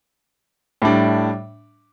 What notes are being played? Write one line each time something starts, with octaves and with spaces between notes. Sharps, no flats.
A2 G3 D4